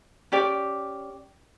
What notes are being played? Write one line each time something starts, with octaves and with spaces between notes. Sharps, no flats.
C#4 G4 D5